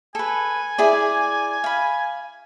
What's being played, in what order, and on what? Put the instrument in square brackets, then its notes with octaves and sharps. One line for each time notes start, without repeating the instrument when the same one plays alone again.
[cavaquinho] A4 B4 [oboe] G#5
[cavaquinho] E4 G#4 D5
F5 B5